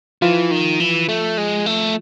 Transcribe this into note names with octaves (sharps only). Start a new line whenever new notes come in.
E3 F3 F4
D#3
E3
A3
G#3
A3